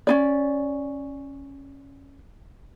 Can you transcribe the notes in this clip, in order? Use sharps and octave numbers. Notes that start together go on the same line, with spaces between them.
C#4 D#4 D5